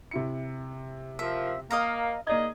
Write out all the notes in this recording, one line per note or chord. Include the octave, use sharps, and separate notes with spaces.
C3 E4 C#7
F3 A#4 E5
A#3 D#5 F5 A#5
A#3 D#4 G#4 D5 D#5 G#6